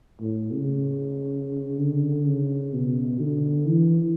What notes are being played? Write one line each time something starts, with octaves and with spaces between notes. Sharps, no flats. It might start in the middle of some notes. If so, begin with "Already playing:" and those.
A2
C#3
D3
C#3
B2
D3
E3